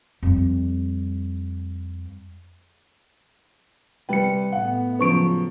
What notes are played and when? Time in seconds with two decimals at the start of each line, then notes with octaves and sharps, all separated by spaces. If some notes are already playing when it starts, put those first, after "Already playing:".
0.23 F2 G3
4.09 C3 G3 B4 G5 C#7
4.52 A2 B3 F#5
4.99 C#3 F3 F#3 B4 C#6 D7